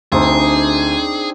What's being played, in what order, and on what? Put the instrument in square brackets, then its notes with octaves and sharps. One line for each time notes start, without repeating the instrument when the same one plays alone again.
[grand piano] D2 [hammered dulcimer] C4 D4 D#4 [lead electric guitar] G#4